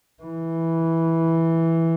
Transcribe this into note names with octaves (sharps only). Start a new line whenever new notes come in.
E3